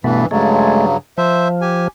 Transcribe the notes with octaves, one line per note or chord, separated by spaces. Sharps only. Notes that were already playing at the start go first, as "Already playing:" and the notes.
G2 B2 E3 A3 B3
G2 C#3 F#3 G#3 A3
F3 C5 E5
G4 G#5